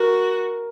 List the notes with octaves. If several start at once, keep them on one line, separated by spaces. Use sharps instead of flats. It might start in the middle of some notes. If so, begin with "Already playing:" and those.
Already playing: F#4 A#4